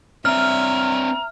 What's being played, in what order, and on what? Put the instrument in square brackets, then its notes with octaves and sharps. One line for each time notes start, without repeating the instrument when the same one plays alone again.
[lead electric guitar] C4 D4 [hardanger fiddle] E5 [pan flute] A#5 [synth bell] F6